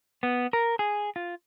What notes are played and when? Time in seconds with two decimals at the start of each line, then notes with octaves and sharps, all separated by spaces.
0.23 B3
0.53 A#4
0.79 G#4
1.16 F4